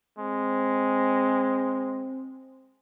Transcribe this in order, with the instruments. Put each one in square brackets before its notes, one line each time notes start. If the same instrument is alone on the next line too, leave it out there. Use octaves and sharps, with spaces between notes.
[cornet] G#3 [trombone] C4